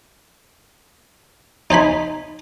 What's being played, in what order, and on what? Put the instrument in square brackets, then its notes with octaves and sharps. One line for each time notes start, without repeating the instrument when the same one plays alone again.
[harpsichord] D#4 C5 G#5 B5